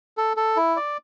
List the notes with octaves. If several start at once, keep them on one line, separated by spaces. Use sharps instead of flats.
A4
A4
E4
D5